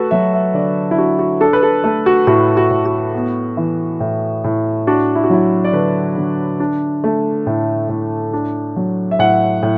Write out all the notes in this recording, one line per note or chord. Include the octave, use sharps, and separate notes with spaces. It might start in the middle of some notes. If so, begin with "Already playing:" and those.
Already playing: A3 F#4 A4 B4
F#3 E5
E5
D3 D5
E4
D4 F#4
F#4
D4 A4
B4
A4
A3 A4
F#4
A2 F#4
F#4
A2
F#4
B3
E3
A2
A2
D4 F#4
E4
F#4
F#3 E4
D5
D3 B4
D3
D4
A3
A2
A2
D4
F#3
E5
A2 F#5
A2